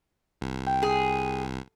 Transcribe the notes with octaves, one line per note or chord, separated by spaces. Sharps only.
C2
G5
G#4